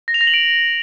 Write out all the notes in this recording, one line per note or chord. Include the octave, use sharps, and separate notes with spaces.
A#6
F7
A#6
F#7
D7